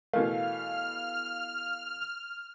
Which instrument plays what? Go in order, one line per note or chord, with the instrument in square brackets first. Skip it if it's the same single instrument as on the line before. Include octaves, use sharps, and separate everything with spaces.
[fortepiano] B2 E3 A3 [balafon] A#4 [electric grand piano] F5 [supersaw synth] F6